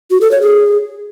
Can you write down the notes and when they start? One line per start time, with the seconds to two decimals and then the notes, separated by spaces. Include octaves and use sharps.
0.11 F#4
0.21 A4
0.31 C#5
0.41 G#4